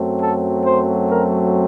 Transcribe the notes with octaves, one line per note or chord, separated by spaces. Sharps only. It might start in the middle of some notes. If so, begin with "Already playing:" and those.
Already playing: F#2 F#3 A3 C4
A4
C5
A#4